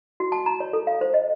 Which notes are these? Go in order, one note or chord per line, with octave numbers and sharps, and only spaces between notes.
F#4
A5
A#5
C#5
A4
F5
C5
D#5